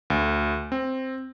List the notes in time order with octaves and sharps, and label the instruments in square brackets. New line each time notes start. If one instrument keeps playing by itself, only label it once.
[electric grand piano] D2
C4